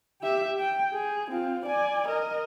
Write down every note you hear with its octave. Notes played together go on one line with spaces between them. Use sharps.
G4 E5
G5
G#4
C4 F4
D5 G#5
A#4 D#5